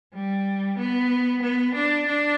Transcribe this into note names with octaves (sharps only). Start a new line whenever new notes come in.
G3
B3
B3
D4
D4